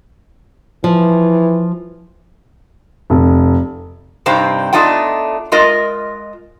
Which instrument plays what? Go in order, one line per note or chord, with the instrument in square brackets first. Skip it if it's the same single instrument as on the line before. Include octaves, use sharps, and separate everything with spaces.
[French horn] E3 [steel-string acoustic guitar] F3
[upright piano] F1
[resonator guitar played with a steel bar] G2 C3 C4 D#4
A3 B3 D4 D#4 F4 G5
G#3 F4 A#4 D#5